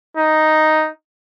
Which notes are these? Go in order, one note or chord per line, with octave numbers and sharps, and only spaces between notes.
D#4